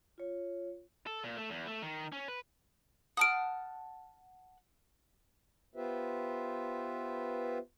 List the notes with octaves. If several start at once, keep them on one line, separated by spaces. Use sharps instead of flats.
F4 C#5
A4
A#2
A3
E2
A3
D#3
C#4
B4
F#5 A5 D#6 F6 D7
B3 F4 G4 B4 C5 E5